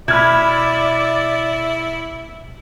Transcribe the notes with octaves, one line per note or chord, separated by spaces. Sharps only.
B2 E4 D5 B5 F6 G#6